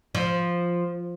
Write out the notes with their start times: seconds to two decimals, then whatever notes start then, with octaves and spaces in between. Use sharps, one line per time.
0.15 F3